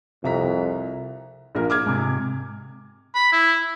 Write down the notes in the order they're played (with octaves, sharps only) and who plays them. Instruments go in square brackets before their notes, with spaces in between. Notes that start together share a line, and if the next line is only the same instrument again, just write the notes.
[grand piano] C2 A#5 B6 [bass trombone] F2
[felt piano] A#1 A#2 A#4
D6 F6 G#6
[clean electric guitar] G#2 C3
[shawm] B5
E4